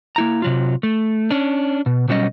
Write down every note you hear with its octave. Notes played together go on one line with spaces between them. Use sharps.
A#3 E4 A#5
C3 F#3 F4
A3
C#4 D4
B2
B2 F#3 G3 C#4 D#5